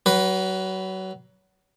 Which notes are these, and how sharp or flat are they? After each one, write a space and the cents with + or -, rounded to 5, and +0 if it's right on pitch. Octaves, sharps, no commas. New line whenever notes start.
F#3 +30 B4 +0